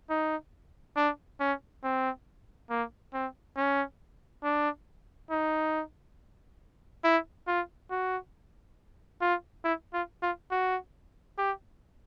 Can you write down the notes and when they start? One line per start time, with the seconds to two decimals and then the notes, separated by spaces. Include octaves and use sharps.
0.10 D#4
0.97 D4
1.40 C#4
1.84 C4
2.70 A#3
3.14 C4
3.57 C#4
4.43 D4
5.30 D#4
7.04 E4
7.47 F4
7.91 F#4
9.21 F4
9.64 E4
9.93 F4
10.22 F4
10.51 F#4
11.38 G4